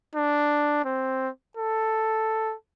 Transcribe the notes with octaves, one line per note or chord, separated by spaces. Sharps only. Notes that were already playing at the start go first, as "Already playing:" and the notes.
D4
C4
A4